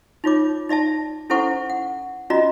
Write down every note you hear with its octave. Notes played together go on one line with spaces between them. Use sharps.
D#4 F4 C#5 D6
D#4 D5 E5 A5
C#4 E4 A4 C5 F#5 C#6
F#5
C#4 F4 F#4 D5 D#5 A#5